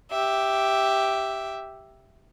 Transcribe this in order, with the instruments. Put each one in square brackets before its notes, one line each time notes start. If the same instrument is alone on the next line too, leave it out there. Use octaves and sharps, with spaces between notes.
[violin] G4 E5